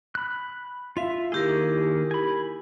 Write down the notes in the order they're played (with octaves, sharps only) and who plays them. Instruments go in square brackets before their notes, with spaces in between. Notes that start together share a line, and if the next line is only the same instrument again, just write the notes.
[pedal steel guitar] B5 F#6
[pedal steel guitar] F4 E5 [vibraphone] F5
[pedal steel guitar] D#3 A#3 G#4 [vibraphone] E4 G4 A#4
[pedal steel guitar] G#5 B5